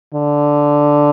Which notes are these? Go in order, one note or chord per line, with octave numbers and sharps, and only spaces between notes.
D3